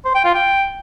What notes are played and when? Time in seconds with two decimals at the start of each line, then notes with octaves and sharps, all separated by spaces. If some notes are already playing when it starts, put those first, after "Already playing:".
0.05 C5
0.15 G5
0.25 F4
0.34 G5